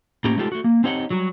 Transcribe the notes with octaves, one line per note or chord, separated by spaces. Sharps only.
A2 A#3 C#4 G4 A#4
G#3 A3 D#4 F4 G4 A4
A3 F#4
A#3
C4 D#4 G4 C#5 D#5 F#5
F#3 G3 F#4